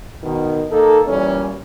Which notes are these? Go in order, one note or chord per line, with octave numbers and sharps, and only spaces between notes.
B2 D#3
A#3 D#4 A4
A#2 E3 G3 C#4